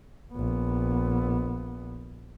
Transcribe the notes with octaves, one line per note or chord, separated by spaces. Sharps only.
A#1 B3